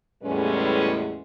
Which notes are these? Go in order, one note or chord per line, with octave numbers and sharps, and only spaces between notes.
E2 A2 G3 G#3 C#4 B4